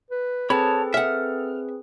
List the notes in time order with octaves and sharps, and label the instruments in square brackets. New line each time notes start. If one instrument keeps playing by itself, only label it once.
[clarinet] B4
[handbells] C4 G#4 B4 [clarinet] A4 [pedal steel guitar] C#5 A5 [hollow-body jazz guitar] B5
[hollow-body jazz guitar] E5 F#5 [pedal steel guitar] F6